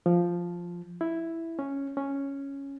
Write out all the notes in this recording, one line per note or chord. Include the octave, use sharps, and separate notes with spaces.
F3
E4
C#4
C#4